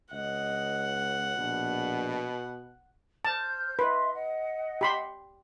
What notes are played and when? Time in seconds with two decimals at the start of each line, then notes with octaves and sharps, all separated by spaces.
0.12 C#2 D#5 F#5
1.37 A#1 B2
3.25 C5 A5 F6 G6
3.79 B4 D#5 E5 C6
4.14 D#5 F#5
4.81 G4 B5 C6